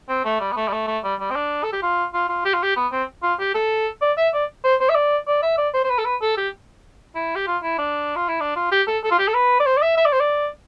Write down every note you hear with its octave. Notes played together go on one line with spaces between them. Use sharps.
C4
A3
G3
B3
A3
G3
A3
A3
G3
G3
C4
D4
A4
G4
F4
F4
F4
G4
F4
G4
B3
C4
F4
G4
A4
D5
E5
D5
C5
C5
E5
D5
D5
E5
D5
C5
C5
B4
A4
B4
A4
G4
E4
G4
F4
E4
D4
F4
E4
D4
F4
G4
A4
A4
F4
G4
A4
B4
D5
C5
D5
E5
E5
D5
C5
D5